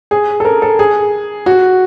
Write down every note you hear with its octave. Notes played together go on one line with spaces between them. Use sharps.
G#4
A4
A#4
A4
G#4
F#4